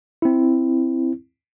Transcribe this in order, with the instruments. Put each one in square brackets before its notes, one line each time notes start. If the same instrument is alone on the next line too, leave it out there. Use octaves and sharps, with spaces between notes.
[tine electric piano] C4 E4